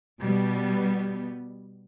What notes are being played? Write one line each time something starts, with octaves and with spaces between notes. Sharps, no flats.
B2 G3 B3